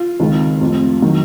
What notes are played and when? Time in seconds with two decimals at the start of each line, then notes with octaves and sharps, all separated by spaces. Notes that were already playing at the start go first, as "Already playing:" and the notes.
Already playing: F4
0.20 C#2 C3 D#3
0.61 F1 F2 C3
1.02 D#3 F#3